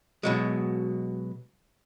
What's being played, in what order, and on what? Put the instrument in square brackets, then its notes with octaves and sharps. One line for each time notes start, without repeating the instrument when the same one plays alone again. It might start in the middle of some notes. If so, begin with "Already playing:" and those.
[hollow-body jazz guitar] B2 F#3 G#3